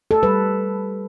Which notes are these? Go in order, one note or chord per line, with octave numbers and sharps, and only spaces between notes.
A4
G3 B4